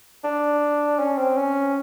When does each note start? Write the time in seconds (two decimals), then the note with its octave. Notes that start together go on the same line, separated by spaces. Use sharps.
0.24 D4
0.99 C#4
1.17 C4
1.37 C#4